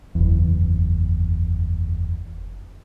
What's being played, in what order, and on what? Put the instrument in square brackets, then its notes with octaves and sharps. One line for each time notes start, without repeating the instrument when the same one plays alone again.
[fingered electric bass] F#1 E2